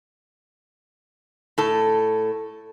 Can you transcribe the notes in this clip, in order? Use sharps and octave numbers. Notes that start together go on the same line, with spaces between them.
A2 A4